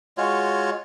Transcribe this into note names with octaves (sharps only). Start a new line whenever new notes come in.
G#3 F4 F#4 C#5